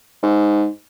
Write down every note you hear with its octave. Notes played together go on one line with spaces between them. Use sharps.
G#2